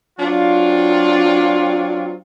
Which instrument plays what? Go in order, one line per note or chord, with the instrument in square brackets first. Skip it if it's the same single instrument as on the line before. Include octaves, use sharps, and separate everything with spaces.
[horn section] F#3 C4 D4 F4